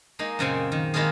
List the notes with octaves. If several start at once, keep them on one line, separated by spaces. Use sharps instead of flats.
G#3 A#3 D#4
F#2 A#2 C#3 C4 C5 G#5
D#3
D#3 G#3 A#3 E4 F4 G#4